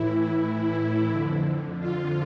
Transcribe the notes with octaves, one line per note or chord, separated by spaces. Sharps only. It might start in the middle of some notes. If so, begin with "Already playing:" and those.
Already playing: A2 E3 E4
F2 D3
F4